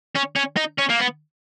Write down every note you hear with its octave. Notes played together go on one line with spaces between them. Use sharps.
C#4
C#4
D#4
C#4
A#3
B3